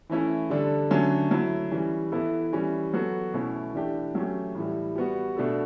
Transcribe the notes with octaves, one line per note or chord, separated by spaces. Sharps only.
E3 A3 C#4 E4
D3 G3 D4 A4
D3 F#3 A3 C#4
F#3 A3 E4
E3 G3 C#4
E3 B3 E4 A4
E3 G3 C#4
F#3 B3 F#4 A4
B2 A3 C#4 E4
E3 A3 D4 G4
F#3 A3 C#4 G4
A2 E3 G3
G3 B3 F#4
B2 A3 D4 F#4 A4